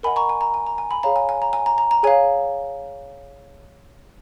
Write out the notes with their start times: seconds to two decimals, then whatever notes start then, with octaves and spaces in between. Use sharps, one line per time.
0.03 A#4 D#5 F#5 G#5 B5
0.16 A#5 C#6
0.29 G#5
0.41 A#5
0.54 G#5
0.67 A#5
0.78 G#5
0.91 G#5 B5
1.03 G#4 C#5 F5 A#5
1.16 G#5
1.29 G#5
1.42 A#5
1.53 G#5
1.66 A#5
1.78 A#5
1.91 A#5
2.03 G#4 C#5 F5 G#5